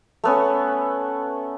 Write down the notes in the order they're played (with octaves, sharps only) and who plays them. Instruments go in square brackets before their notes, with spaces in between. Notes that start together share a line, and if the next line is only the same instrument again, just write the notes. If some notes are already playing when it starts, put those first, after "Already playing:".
[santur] A3 B3 C#4